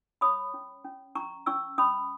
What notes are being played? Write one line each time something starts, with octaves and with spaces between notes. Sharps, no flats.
C#5 B5 D#6
C#4
C#4
C#4 A#5 C#6
C#4 C#6 E6
C#4 B5 D#6